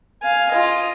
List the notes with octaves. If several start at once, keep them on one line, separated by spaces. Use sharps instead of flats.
F5 G#5
F4 D#5